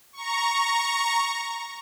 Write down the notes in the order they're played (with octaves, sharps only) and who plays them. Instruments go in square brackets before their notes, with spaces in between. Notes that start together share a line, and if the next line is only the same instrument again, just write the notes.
[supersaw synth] A#5 C#6